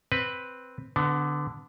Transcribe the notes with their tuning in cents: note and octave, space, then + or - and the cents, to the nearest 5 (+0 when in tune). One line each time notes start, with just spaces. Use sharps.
C4 +0 B4 +0
D3 +0 B3 +25